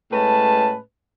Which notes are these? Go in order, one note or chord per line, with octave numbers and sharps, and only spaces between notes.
A2 G#3 C#4 B4 A5